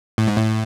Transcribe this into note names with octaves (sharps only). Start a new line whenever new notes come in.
A2
G#2
A2